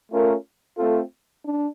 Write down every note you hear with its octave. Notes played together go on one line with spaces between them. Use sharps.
A3 C#4 F4 A#4
A3 C4 F4 A4
D4